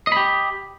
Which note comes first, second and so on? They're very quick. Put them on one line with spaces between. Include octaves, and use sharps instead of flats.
D#5 B5 G4